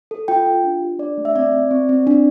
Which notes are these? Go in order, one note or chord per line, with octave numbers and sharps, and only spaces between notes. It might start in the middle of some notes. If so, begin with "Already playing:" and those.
A4
F4 G5
F4
D4
G4
D4 D5
A3
E5
C4 D5
C4
C4
C4
D4